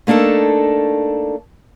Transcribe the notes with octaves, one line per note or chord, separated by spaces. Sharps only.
A3 A#3 D4 D#4 A4